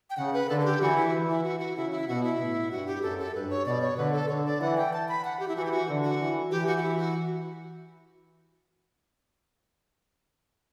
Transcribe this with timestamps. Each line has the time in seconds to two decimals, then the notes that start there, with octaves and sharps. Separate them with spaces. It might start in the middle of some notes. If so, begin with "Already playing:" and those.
0.10 G5
0.17 C#3 F#5
0.33 B4
0.49 D3 A4
0.60 A4
0.65 G4
0.80 E3 F#4
0.97 E4
1.13 E3
1.29 E4
1.44 F#4
1.60 F#4
1.76 C#3 E4
1.92 E4
2.08 B2 F#4
2.24 E4
2.40 A2
2.71 G2 F#4
2.87 G4
3.02 F#2 A4
3.19 A4
3.34 G2 B4
3.50 C#5
3.66 B2 D5
3.81 C#5
3.97 D3 B4
4.13 A4
4.29 D3 C#5
4.45 D5
4.61 E3 F#5
4.77 G5
4.93 A5
5.09 B5
5.25 F#5
5.40 G4
5.48 E4
5.56 E3 F#4
5.66 G4
5.72 F#4
5.88 D3
6.04 F#4
6.19 E3
6.51 E3 G4
6.67 F#4
6.77 F#4
6.83 E4
6.98 F#4